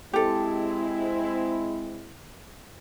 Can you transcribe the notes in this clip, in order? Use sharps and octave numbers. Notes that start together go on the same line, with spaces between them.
G#3 C4 E4 G4 A4